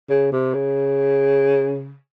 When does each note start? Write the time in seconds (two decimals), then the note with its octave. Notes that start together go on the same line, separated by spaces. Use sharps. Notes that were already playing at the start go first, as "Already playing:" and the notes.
0.10 C#3
0.32 C3
0.54 C#3